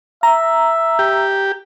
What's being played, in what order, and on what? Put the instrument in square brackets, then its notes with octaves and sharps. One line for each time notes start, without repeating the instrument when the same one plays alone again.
[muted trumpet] E5 [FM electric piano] A#5
[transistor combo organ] G4